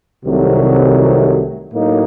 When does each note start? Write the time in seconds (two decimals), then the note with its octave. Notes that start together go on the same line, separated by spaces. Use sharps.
0.24 C2 C3 D#3 F#3 A3
1.73 A2 F#3 A#3 D#4